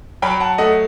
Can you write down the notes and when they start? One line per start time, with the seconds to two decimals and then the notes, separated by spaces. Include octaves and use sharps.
0.22 F#3 G5 B5
0.40 F#5 A5
0.58 A3 D#5 F#5